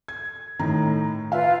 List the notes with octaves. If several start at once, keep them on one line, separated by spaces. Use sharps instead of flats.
G#6
A2 D#3 A#5
F4 B4 E5 F5